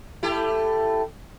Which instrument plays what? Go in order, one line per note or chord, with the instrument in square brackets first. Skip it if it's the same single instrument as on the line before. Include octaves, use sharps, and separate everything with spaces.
[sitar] A3 E4 G4